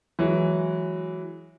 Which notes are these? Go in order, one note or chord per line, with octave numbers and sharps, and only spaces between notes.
E3 F#3 G#3